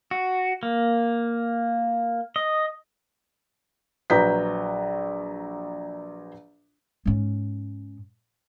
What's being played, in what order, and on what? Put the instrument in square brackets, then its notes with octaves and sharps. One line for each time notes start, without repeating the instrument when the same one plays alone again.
[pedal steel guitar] F#4
A#3
D#5
[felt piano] A#1 F#3 B4 A#5 G6 B6
[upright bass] G#2 C#4